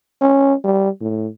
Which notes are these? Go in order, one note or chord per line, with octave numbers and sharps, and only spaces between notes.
C#4
G3
A2